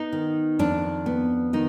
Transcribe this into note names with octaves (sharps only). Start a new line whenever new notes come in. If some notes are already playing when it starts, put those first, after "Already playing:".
Already playing: B3 D#4
D#3
F2 D4
B3
D#3 D#4